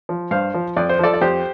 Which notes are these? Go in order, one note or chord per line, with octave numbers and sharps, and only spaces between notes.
F3
G2 C5 F5
F3
F2 D5
C5
F3 A4 D5
D5
F2 G4 C5